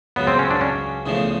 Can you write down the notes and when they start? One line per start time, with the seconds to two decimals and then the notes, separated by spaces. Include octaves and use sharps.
0.16 C#2 C#3 F#3 B3
0.27 C4
0.39 C#4
0.51 D4
0.61 C#4
1.06 E2 C#3 F3 A3